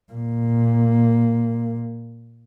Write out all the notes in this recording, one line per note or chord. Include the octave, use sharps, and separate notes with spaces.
A#2 A#3